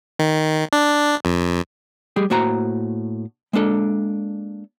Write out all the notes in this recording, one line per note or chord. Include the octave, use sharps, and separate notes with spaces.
D#3
D4
F2
G3 G4 G#4
A2 A#3 F#4 C5 A#5
G#3 A#3 D4 A4